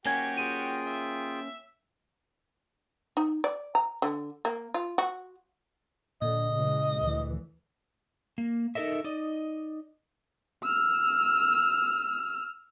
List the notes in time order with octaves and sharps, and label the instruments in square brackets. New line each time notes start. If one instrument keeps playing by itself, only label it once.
[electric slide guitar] A#3 C#4 [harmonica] F#4 G4 [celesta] G#5 G#6
[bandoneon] F4 G#4 G5 [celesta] D#7
[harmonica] E5
[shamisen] D#4
D5
A#5
D3
A#3
F4
F#4
[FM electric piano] A#2 [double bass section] D3 [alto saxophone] D#5
[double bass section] C#3 E3 G#3
D2 E3
[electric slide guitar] A#3
D#4 A4 A#4 D#5 E5
D#4 D5 D#5
[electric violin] E6 F6